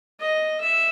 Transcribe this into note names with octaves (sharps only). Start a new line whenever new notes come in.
D#5
E5